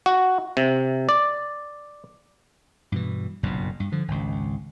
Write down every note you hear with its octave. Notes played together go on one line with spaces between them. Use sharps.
F#4
C3
D5
G2 B2 E3
F#1 B1 G2 A#2
G2
D3 F3
G#1 C#2